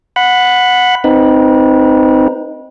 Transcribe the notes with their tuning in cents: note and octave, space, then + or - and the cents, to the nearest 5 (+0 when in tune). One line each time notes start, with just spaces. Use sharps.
F#5 -15 B5 +10
C4 -10 D#4 +0 B4 -30